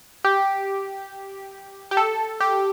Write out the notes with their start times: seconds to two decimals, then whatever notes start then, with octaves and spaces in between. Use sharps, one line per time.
0.25 G4
1.91 G4
1.97 A4
2.40 G4